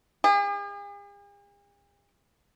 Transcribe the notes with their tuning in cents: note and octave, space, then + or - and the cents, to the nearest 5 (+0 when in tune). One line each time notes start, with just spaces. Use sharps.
G#4 -45